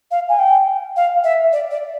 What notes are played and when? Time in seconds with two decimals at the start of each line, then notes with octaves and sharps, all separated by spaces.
0.11 F5
0.29 G#5
0.39 G5
0.96 F5
1.24 E5
1.53 D5
1.71 D5